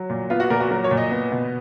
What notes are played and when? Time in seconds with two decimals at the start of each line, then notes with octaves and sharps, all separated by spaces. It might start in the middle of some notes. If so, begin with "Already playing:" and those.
Already playing: F#3
0.10 A#2
0.30 B3 F4
0.40 F#4
0.50 A#2 A#4
0.60 F#4
0.70 F#3 A#4
0.84 C#5
0.91 A#2
0.97 D#5
1.11 B3
1.32 B2